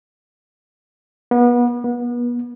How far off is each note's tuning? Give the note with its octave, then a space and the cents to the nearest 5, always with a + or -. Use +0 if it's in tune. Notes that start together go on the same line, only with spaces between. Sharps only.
B3 -30
B3 -35